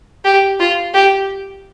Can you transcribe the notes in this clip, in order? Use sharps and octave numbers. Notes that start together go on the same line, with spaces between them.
G4
F4
G4